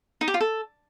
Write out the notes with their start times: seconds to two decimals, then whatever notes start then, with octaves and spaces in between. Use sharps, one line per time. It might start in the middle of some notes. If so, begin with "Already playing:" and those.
0.21 D#4
0.28 G4
0.34 F4
0.41 A4